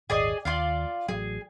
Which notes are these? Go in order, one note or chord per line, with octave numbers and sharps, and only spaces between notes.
D#1 G#1 G#4 D5 D#5
D#2 F4 D5 F5
A1 F#3 G#4